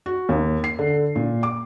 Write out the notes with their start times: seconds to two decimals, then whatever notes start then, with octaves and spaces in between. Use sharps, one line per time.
0.06 F#4
0.29 D#2
0.64 C7
0.79 D3
1.16 A#2
1.43 D6